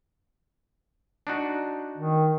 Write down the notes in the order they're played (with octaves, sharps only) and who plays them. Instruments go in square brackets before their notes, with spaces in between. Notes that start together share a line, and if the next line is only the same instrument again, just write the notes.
[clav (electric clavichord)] D4 D#4 F#4
[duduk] D#3